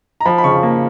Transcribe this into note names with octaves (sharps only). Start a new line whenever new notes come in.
A#5
F3 B5
B5
C#3 C#6
A#3